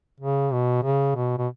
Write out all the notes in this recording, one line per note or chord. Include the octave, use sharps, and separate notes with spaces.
C#3
B2
C#3
B2
B2